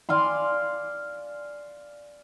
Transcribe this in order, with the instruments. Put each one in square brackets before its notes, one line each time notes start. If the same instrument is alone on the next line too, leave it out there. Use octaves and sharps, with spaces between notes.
[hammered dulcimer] D5 F5 G#5 C6